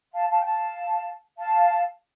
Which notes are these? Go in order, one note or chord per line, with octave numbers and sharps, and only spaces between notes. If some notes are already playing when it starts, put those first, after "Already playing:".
F5 A5
F5 A5
G5
F5 A5
F5 A5